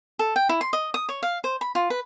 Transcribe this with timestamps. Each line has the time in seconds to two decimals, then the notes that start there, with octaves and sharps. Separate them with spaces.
0.19 A4
0.36 G5
0.49 E4
0.61 C6
0.73 D#5
0.94 D#6
1.09 C#5
1.23 F5
1.44 C5
1.61 B5
1.75 F4
1.90 B4